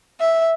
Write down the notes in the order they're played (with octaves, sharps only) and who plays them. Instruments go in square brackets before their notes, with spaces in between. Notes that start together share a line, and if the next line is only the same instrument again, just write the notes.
[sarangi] E5